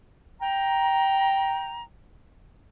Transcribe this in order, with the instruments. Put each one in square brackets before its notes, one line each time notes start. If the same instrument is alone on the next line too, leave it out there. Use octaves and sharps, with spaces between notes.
[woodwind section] G5 A#5